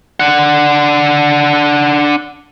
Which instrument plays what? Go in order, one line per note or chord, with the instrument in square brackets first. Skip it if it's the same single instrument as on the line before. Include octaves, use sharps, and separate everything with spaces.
[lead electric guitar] D4 F#5